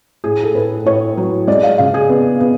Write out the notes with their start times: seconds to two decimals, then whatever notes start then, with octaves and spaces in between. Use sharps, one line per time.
0.24 A2 G#4
0.44 A4
0.55 A2 B4
0.86 A2 C#5
1.17 F#3
1.47 G#3 D5
1.63 F5
1.78 C#3 F5
1.94 G#4
2.09 B3
2.40 B3